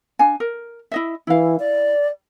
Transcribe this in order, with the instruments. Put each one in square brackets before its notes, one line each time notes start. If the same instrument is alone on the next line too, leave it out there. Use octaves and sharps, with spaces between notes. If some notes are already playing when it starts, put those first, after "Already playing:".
[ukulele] D4 F5 G#5
A#4
E4 D#5 E5
[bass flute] E3 [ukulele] E4 F5
[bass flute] D5